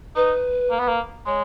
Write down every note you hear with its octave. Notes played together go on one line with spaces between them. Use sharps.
D#4 B4
A#3
B3
A#3
G#3 C#5